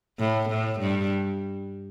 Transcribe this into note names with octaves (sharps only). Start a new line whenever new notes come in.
A2
A2
G2